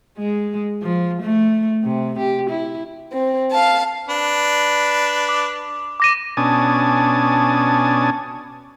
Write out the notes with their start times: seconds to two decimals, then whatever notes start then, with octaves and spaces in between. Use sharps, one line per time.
0.18 G#3
0.83 F3
1.23 A3
1.84 C3
2.19 G4
2.50 E4
3.12 C4
3.52 F5 A5
4.09 D4 B4
5.29 D6
6.00 D6 A#6 D#7
6.37 B2 C#4 D4 G#5 A5 D#6